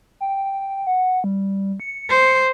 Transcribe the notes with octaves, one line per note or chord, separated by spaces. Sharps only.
G5
F#5
G3
C#7
C5